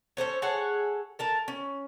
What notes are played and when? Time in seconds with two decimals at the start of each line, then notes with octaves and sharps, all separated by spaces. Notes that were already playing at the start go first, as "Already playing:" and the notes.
0.17 C#4 A4 C5 C#5
0.42 G#4 A4 C#5 F#5
1.19 A4 A#4 A5
1.48 C#4